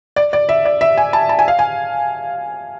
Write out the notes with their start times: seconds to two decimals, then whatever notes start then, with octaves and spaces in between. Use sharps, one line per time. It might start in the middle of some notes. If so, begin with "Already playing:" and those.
0.16 D5
0.33 D5
0.49 E5
0.65 D5
0.81 E5
0.97 G#5
1.13 A5
1.29 A5
1.39 G#5
1.48 F5
1.59 G#5